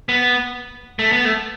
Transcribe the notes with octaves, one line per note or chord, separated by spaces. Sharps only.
B3
A3
B3
A3